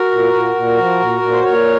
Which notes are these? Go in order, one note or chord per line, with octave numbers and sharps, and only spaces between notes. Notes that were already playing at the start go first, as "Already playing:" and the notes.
Already playing: F#4 A#4
A#2
A#2
A#2
F3
A#2
A#2
C5
A#2 A#4 C#5